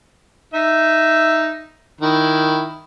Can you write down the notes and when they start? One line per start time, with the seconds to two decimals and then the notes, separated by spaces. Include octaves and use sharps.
0.54 D#4 E5
2.01 D#3 E4